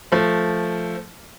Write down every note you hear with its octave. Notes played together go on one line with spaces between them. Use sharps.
F3 A3